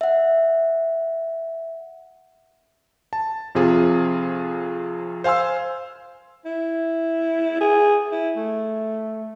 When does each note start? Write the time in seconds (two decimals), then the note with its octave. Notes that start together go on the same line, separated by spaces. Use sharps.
0.01 E5 F#5
3.13 A5
3.55 F2 C3 F4 G#4
5.24 C5 F5 G#5 C6 E6
6.45 E4
7.61 G#4
8.12 E4
8.36 A3